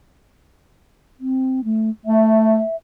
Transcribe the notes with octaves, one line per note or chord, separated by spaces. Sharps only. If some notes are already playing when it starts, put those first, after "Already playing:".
C4
A3
A3 E5